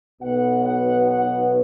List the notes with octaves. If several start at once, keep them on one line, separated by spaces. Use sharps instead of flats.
B1 B2 B3 F#5
F#5
F#5